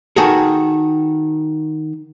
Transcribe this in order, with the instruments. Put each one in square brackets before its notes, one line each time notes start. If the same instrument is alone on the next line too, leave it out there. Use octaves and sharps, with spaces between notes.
[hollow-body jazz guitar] D#3 F#4 G#4 A4